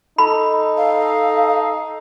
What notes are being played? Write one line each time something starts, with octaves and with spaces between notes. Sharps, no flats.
D#4 A4 B5
F5